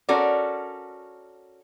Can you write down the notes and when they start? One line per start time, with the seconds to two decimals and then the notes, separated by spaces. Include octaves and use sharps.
0.09 C#4 F#4 A4 A#4 D5